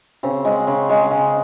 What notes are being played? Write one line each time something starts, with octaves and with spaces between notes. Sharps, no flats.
C#3 C4
G#3
C#3
G#3
C#3